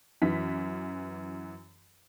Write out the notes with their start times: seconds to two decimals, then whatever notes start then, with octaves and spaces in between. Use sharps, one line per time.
0.22 F#2 E3 B6